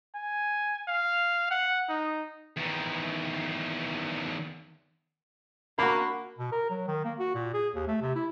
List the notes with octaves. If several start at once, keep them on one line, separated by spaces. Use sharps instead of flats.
G#5
F5
F#5
D#4
E2 D#3
A#3 D4 F#4 B5
B2
A#4
F#3
D#3
A#3
F#4
A#2
G#4
D#2
A3
C3
E4